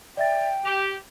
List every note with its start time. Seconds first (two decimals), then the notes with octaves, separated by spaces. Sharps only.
0.17 D5 E5 G5 A6
0.65 G4 F7